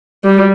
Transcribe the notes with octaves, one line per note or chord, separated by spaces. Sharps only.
G3